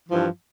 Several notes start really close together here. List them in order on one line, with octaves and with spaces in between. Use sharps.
E3 F3 G2